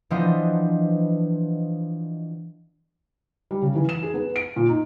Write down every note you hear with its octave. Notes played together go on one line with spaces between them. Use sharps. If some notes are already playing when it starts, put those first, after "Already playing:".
E3 F3 B3 D4 C5 D#5
G3
C#3
E3
E7
G#4
B3
D7
A#2
D#4